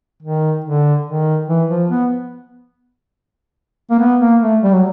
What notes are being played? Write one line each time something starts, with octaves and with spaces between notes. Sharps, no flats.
D#3
D3
D#3
E3
F3
B3
A#3
B3
A#3
A3
G3
F#3